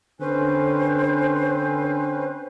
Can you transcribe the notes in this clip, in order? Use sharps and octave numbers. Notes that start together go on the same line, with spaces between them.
D3 C4 C#4 B4 C5